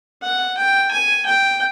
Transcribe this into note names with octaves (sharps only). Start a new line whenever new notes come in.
F#5
G5
G#5
G5